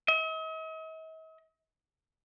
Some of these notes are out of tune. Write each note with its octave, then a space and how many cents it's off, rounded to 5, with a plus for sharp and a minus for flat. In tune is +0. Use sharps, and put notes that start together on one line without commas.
D#5 +45